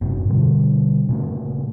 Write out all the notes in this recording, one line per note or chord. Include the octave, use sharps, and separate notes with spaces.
F#1 G#2 C3
B2 D3 G3
A#2 C#3 A3